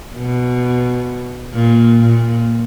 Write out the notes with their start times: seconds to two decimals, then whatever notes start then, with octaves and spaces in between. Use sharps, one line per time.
0.17 B2
1.55 A#2
2.01 A#2